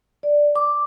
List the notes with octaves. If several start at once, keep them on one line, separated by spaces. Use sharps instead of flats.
D5
D6